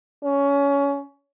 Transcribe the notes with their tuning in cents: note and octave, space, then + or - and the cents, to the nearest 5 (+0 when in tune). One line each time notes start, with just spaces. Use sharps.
C#4 +20